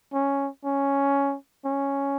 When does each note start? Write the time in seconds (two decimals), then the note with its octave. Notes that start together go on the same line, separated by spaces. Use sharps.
0.13 C#4
0.65 C#4
1.66 C#4